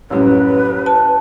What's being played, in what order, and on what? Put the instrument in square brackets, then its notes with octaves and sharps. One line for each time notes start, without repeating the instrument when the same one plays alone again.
[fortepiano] A1 F#2 [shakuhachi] B4
[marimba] A5